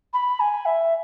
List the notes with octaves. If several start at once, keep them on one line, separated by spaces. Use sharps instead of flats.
B5
G#5
E5